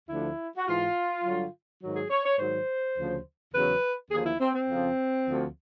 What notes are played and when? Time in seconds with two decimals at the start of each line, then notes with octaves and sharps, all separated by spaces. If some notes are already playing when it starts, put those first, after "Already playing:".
0.09 D2 D3 F3 E4
0.57 F#4
0.67 G#2 E3 F4
1.24 G2 D3 F#3
1.81 G#2 D#3 F#3
1.96 G#4
2.10 C#5
2.25 C#5
2.39 G#2 D#3 F#3 C5
2.97 D2 C#3 F3
3.54 E2 C#3 F#3 B4
4.11 D#2 D3 F3 G#4
4.26 E4
4.40 C4
4.55 C4
4.69 F2 C#3 F3
5.25 D2 D3 F3